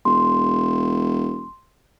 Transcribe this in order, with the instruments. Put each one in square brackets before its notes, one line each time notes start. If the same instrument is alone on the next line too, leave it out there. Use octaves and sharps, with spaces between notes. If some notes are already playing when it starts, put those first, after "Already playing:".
[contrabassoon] E1 [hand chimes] C6